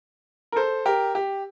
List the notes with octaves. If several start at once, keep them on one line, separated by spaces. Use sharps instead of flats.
A#4
A4 C5
G4 A#4
G4